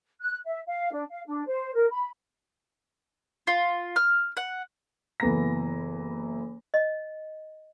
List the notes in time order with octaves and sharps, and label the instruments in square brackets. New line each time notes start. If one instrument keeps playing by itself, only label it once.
[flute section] F#6
E5
F5
D4
F5
D4
C5
A#4
B5
[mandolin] F4
F6
F#5
[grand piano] F#1 E3 B3 A4 A#5 A#6
[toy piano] D#5